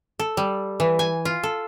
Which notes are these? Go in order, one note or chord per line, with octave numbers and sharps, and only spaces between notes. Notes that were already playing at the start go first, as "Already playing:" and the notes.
A4
G3
E3
G#5
F4
A4